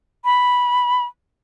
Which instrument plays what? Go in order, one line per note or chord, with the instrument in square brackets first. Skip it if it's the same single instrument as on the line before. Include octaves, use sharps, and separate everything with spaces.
[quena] B5